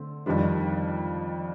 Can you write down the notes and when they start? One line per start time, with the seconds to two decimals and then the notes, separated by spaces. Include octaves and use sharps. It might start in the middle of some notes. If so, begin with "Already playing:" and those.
Already playing: D3 A3 C4
0.26 F2 D#3 G3 D4